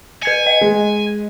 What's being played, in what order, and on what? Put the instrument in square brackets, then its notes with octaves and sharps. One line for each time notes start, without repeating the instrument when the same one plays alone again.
[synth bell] B4 G#6 C#7 [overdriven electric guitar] G#5
[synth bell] D#5
[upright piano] G#3